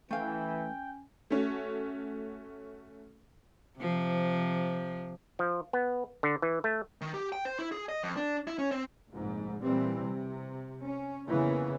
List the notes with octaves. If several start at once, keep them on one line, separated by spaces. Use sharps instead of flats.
E3 A3 C#4 F5 G5
A3 C#4 F#4
C3 F3
F3
B3
D3
E3
A3
D#3
G4
G5
C5
E4
G#4
D#5
F2
D4
E4
C#4
C4
F1 A#1 G#2
A#2 E3 G3 C4
C3
C#4
F2 C#3 E3 A#3 B3 C#4